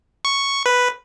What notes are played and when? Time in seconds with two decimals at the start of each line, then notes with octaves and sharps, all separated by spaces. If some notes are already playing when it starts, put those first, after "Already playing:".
0.25 C#6
0.66 B4